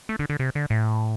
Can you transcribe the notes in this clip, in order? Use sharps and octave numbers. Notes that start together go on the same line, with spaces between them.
A3
D3
D3
C3
D3
A2